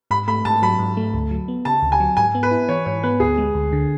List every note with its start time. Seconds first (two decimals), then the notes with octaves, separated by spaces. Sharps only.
0.11 G#2 B5
0.28 A3 B5
0.45 G#2 A5
0.62 F#3 B5
0.79 G#2
0.97 A3
1.14 D2
1.31 F#3
1.48 B3
1.65 C#3 A5
1.83 D2
1.92 G#5
2.00 F#3
2.17 G#2 G#5
2.35 B3
2.43 B4
2.51 E4
2.69 E3 C#5
2.86 G#2 C#5
3.03 B3 B4
3.20 D2 G#4
3.38 G#3
3.55 D2
3.73 D3